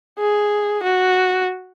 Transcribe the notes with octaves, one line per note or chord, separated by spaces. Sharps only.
G#4
F#4